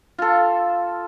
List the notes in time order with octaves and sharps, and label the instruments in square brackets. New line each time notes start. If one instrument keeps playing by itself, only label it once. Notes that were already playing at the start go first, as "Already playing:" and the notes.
[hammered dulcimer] F4 A4